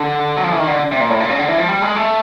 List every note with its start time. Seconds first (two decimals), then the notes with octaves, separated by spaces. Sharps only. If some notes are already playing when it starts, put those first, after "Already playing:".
Already playing: D3
0.37 F#3
0.44 F3
0.52 E3
0.59 D#3
0.67 D3
0.92 C3
1.00 A#2
1.10 A2
1.20 A#2
1.30 C#3
1.39 D3
1.48 E3
1.58 F3
1.68 G3
1.82 G#3
1.96 A3